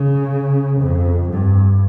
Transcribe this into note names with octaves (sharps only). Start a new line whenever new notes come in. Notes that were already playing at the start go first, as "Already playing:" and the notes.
Already playing: C#3
F2
G2